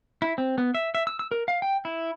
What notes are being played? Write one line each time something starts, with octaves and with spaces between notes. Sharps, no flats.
E4
C4
B3
E5
E5
E6
E6
A#4
F5
G5
E4